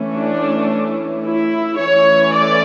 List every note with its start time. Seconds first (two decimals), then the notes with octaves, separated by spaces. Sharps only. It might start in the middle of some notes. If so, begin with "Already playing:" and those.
Already playing: E3 A3 C#4
0.16 D4
1.25 E4
1.79 E3 A3 C#4 C#5
2.34 D5